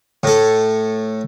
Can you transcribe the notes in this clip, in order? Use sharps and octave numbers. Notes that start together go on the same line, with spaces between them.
A2 A4